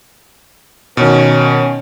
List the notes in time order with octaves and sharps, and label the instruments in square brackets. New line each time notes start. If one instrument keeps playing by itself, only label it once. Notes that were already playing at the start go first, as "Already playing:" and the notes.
[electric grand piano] B2 D#3 [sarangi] C#4